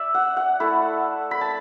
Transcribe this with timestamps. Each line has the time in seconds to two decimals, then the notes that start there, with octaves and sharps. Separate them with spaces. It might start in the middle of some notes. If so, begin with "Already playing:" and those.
Already playing: D5 E5
0.15 F#5
0.37 F#5
0.60 A3 E4
1.31 B5
1.41 A5